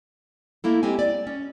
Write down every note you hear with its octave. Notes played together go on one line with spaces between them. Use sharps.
A3 A#3 E4 A4
G#3 C4 G4 G#5
D5
C#4